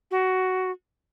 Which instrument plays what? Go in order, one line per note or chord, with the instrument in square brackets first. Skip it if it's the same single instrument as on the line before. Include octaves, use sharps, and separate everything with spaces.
[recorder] F#4